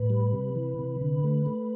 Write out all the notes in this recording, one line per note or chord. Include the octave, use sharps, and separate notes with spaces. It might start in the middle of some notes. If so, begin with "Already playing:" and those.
Already playing: A2 B4
G3
C3
E3
C3
D3
A3
A3